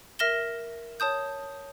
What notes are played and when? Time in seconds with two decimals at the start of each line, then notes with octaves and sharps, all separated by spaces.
0.19 A#4 E5 F6 A#6 E7 G7
1.00 C#5 A5 D#6 G6